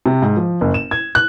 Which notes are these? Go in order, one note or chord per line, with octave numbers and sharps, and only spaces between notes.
C3
G#2
F3
F#1
E7
G#6
F#6